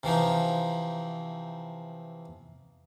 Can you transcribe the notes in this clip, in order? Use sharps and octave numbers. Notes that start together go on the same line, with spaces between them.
C3 E3 F3 D#4